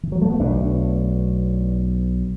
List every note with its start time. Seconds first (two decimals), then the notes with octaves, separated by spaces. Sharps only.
0.03 E3
0.12 F#3
0.22 A3
0.30 B3
0.39 B1 B2 A3 D4